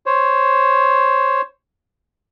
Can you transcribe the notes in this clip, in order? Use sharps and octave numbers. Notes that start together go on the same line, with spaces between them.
C5 C#5